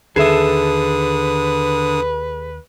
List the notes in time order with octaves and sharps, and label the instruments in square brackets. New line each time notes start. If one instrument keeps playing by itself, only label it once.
[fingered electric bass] D#2 [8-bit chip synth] D3 D#6 [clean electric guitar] G#4 A4 E5 [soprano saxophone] B4